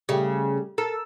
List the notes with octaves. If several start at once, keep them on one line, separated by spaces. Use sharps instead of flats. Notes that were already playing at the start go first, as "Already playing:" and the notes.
C#3 G3 A3 G4
A4 A#4 A5 E6